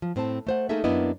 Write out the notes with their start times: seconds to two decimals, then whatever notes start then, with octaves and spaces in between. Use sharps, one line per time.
0.02 F3
0.16 A2 C4 C5 A5
0.47 A3 C5 F#5
0.69 A3 A#3 D#4 G#4 A4 E5
0.84 F#2 A#3 B3 D4 E4 D#5